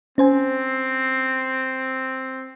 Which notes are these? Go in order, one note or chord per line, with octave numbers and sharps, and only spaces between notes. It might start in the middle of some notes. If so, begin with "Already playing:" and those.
C4 C#4 C5 G#5